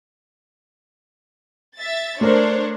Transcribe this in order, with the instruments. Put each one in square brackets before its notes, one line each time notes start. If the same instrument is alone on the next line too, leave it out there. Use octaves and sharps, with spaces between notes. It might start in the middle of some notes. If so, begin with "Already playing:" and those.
[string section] E5 A6
[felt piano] A3 A#4 [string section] D4 C5 C#5